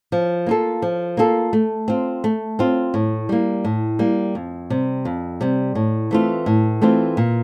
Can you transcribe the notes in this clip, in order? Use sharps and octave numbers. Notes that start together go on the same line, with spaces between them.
F3
A#3 F4 A4
F3
A#3 F4 A4
A3
C4 F4
A3
C4 F4
A2
G3 A#3
A2
G3 A#3
F2
C3 G3
F2
C3 G3
A2
E3 A3 C4 F4
A2
E3 A3 C4 F4
A#2